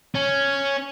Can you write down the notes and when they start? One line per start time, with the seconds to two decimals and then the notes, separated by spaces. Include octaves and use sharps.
0.15 C#4